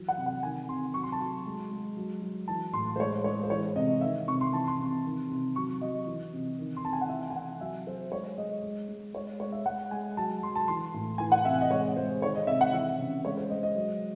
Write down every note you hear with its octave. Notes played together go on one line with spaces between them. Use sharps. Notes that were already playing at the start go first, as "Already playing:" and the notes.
Already playing: E3 F#3
F#5
C3
F#5
D#3 G#5
C3 C6
F#3 C#6
C6
A5
F#3 C6
G#3
G#3
F#3
F#3
E3 A5
A2 C6
C5
G#3 C#5
G#3 C#5
C5
E3 C#5
C3 D#5
D#3 E5
C3 C#6
C6
E3 A5
C6
C3
D#3
C3
F#3 C#6
F#3 D#5
E3
C3
D#3
C6
C3 A5
G#5
F#5
E3 E5
G#5
C3 F#5
F#3 E5
F#3 C5
G#3 C#5
G#3 D#5
G#3
G#3
G#3 C#5
G#3 C#5
E5
G#3 F#5
G#3 G#5
F#3 A5
F#3 C6
A5
E3 C6
A2
E3 G#5
F#5
C3 E5
D#5
G#3 C#5
G#3 C5
D#3 C#5
D#5
C3 E5
F#5
E3 E5
C#3
G#3 C#5
C5
G#3 D#5
D#5
F#3